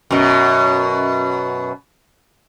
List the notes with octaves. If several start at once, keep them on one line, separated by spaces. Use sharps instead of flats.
F#2 B2